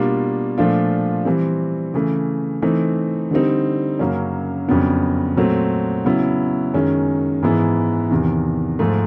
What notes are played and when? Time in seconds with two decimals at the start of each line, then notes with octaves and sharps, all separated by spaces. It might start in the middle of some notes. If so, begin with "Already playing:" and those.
Already playing: B2 G3 A#3 D4 F4
0.58 A#2 F3 A3 D4 F4
1.25 E3 G3 C4
1.94 C#3 E3 A3
2.62 E3 A3 C4 D#4
3.31 D3 G3 C4 D#4
3.99 F#2 C#3 F#3 A#3 C#4
4.68 F2 C#3 F#3 B3 D4
5.37 A#2 F#3 A3 C4
6.05 C#3 F#3 B3 E4
6.73 F#2 D#3 G#3 C#4
7.43 G#2 E3 G#3 B3 E4
8.10 E2 C3 D#3
8.79 G#2 F3 A3